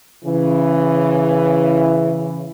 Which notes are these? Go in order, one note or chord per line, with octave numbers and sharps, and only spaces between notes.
C#3 E3